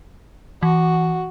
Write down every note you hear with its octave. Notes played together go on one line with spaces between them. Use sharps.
E3 F#4